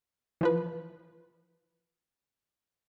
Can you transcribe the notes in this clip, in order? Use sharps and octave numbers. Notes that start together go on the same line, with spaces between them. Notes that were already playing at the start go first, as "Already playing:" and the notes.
E3 F3 B4